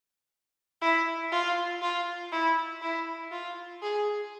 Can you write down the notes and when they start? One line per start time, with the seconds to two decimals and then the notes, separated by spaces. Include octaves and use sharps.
0.82 E4
1.32 F4
1.82 F4
2.32 E4
2.82 E4
3.32 F4
3.83 G#4